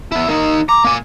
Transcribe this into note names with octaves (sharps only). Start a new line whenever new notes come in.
B3 E4
A#3 D#4
A#5 D6
A#3 G#5